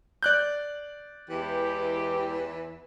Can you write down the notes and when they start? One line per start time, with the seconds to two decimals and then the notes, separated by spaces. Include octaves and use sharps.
0.23 D5 F#6 G6
1.30 E2 E3 G#3 G4